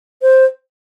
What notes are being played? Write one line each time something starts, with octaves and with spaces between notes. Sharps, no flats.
C5